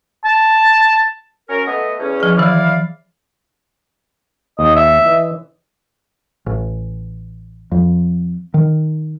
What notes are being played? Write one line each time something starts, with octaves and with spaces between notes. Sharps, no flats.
A5
F#3 C#4 A#4
A3 B3 D#5
E2 C#4
F3 G#4
D#3 E3 F#3 E4 D5 F5
D#2 D#5
E5
E3 D#5
A1
F2
D#3